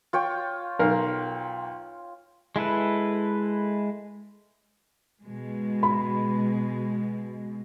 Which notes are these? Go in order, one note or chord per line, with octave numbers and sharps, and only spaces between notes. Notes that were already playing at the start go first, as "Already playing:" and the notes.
F4 C#5 G5
B1 A#4 F5
G#3 E4 A4 B4
B2 G#3
B5